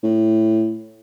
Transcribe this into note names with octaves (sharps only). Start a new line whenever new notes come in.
A2